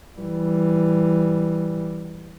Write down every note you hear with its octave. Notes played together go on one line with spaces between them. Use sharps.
E3 G3